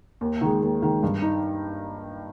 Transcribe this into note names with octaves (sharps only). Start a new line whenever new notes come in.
D#2
D#3 G#3
D#2
D#3 G#3
G2
D#4